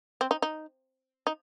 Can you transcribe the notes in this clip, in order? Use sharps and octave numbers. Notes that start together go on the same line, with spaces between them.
C4
D#4
D#4
D#4